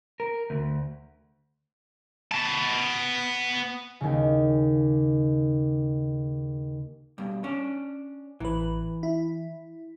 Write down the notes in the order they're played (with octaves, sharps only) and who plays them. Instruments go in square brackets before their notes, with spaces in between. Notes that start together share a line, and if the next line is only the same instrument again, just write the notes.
[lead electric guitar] A#4
D2
[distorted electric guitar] B3 A5
[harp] D#2 C#3
[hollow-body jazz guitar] G2 B2
C#4 D4
[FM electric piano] A1 B4 [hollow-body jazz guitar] E3
[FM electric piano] E4